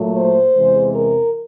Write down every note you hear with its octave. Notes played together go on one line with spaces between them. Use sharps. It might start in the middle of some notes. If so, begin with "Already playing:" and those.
Already playing: A#2 F#3 A3
C5
E2 C3 E3 G#3
A#4